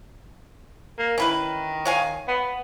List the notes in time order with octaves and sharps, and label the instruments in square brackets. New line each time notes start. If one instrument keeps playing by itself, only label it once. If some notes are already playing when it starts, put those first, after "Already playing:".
[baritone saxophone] A#3
[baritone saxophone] D#3 [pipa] C#4 E4 B4
[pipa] C#5 F5 G#5
[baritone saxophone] B3